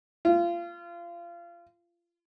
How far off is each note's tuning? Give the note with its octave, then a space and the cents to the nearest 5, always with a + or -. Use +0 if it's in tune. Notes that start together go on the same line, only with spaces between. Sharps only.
F4 -25